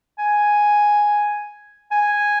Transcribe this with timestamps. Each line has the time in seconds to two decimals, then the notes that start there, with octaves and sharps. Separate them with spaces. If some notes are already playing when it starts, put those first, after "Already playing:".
0.18 G#5
1.91 G#5